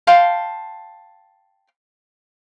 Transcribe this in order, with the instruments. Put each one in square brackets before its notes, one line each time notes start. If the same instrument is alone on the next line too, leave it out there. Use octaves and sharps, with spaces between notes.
[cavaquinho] F5 G5 A5 C6